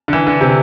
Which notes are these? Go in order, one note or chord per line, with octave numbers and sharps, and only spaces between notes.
D3
E3
D3
C3